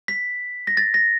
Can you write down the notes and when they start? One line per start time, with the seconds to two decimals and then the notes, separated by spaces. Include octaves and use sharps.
0.08 B6
0.67 A#6
0.77 A6
0.94 A#6